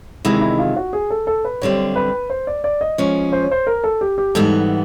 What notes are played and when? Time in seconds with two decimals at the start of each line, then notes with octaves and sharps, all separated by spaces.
0.25 E2 C3 D#3 G#3 E4
0.41 E4
0.59 F4
0.76 F#4
0.93 G#4
1.10 A4
1.27 A4
1.45 B4
1.62 F#2 D3 G3 C4 C#5
1.96 B4
2.30 C5
2.47 D5
2.64 D5
2.81 D#5
2.98 F3 G#3 C#4 C#5
3.32 C5
3.42 C#5
3.51 C5
3.67 A#4
3.84 A4
4.01 G4
4.18 G4
4.35 G#2 E3 G3 B3 A4